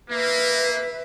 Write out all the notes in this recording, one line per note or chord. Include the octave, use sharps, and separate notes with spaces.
A#3 B4 E5